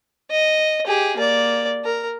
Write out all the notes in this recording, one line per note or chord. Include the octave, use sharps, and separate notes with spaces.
D#5
G4 G#4
A#3 D5
A#4